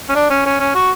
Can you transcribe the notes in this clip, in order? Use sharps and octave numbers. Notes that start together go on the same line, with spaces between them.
C#4
D4
C#4
C#4
C#4
F#4